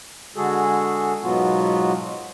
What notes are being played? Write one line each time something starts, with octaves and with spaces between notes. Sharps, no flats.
D3 G#3 F#4 G#4 A4
G#2 B2 F#3 B3 F4 F#4